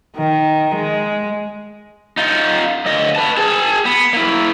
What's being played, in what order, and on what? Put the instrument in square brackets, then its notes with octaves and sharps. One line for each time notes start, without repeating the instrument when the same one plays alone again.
[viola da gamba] D#3
G#3
[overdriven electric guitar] D#4 F4
D2 D#5
B4 A5
G#4 A5
B3
A#3 E4